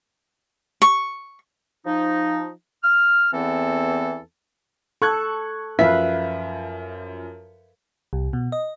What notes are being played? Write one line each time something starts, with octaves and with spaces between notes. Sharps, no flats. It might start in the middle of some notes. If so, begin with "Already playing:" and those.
C#6
F3 D#4
F6
E2 E3 B3 C4 A4
A4 C#6 F#6 G#6
F#2 F3 B4 E5 F5 B6
C2
B2
D#5